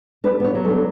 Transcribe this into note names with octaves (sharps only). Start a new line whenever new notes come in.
D4 B4
B3 C#5
F#3
A4
D4